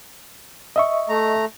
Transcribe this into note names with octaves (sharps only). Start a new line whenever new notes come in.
D#5 E5 C#6
A3 A#5